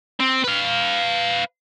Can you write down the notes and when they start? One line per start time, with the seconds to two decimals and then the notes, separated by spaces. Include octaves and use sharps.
0.20 C4
0.44 B4 F5